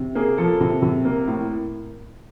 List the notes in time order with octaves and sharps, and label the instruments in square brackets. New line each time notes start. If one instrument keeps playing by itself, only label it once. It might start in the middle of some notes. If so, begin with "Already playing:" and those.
Already playing: [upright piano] C3
A#3 G#4
F3 A4
C3
C3
A#3
A2